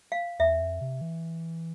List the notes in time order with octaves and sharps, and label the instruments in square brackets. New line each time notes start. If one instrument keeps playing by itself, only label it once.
[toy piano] F5
[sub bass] E2 [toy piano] E5
[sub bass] F2
C3
E3